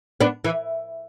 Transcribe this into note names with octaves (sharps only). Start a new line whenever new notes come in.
B3 D4
E3